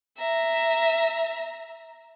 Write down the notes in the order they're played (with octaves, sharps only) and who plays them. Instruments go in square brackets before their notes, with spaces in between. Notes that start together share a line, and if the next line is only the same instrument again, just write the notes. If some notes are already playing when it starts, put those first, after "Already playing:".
[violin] E5 A#5